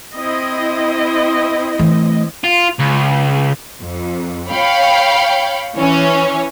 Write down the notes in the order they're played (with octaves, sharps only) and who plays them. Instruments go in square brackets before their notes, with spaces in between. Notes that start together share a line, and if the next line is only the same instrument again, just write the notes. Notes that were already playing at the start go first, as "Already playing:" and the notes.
[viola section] C4 E4 D#5
[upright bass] E3 A3
[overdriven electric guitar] F4
C#2
[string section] F2
C#5 F5 G5 B5
E3 C#4 C#5